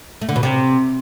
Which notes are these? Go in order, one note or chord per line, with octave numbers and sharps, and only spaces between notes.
A3
D3
B2
C3